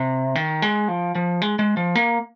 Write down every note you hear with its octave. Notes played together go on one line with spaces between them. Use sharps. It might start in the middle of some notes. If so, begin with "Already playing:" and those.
Already playing: C3
D#3
G#3
F3
F3
G#3
G#3
F3
A#3